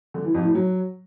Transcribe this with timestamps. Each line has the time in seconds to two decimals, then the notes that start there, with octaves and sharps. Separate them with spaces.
0.14 D3
0.24 E3
0.35 F2
0.45 A2
0.55 F#3